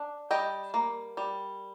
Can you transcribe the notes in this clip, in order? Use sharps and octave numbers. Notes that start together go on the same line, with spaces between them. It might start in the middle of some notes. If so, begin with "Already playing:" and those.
Already playing: D4
G3 D#5 G5
A#3
G3